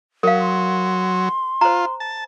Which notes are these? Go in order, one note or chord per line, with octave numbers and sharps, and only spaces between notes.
F#3 A#4 F5
C6
F4 C5 A#5
A5